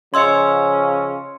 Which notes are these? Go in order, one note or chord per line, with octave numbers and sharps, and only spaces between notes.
C#3 F3 C#4 D#5 C6 E6 G#6 C#7